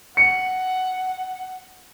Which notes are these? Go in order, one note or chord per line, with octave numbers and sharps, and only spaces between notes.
F#5 C#7